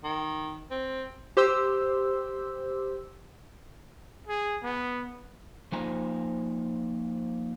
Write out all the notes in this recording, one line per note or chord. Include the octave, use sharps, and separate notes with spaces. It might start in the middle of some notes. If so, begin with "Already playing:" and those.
D#3
C4
G4 C5 C6 E6
G#4
B3
F3 A#3 D#4 C5 G#5 A#5